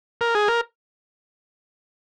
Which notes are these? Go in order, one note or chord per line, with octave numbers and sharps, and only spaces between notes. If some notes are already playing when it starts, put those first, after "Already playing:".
A#4
G#4
A#4